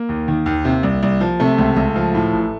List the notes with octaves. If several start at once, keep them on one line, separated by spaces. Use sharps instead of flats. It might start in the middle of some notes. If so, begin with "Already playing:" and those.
Already playing: A#3
D#2
D#3
D#2
C3
C2
C2
F3
C3 A3
C#2
C#2
F3
A2
A1